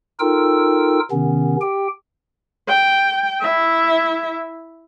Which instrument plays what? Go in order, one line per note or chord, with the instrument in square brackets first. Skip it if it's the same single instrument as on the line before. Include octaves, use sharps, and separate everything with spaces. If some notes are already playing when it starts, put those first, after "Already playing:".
[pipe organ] D#4 F4 A4 A#4 G5 E6
C3 D#3 B3 C#4
G4 G5
[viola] G5
E4 E5